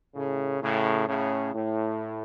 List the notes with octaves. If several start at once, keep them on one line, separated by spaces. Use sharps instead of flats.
A2 C#3
A2 C#3
A2 C#3
A2